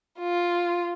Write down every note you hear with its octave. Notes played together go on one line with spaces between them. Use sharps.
F4